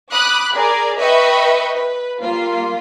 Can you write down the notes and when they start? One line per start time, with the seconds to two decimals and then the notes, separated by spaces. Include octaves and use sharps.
0.12 B5 D6 D#6 F#6
0.54 G#4 A#4 D5 A#5
0.98 B4 D#5 E5 G5 B5 C#6
1.76 B4
2.21 G3 A#3 F4